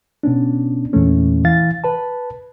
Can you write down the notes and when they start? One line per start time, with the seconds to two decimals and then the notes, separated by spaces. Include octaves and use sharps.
0.23 B2 B3 C#4 D4
0.93 E2 A#2 E3 A3 C#4
1.45 E3 F5 A6
1.84 B4 A5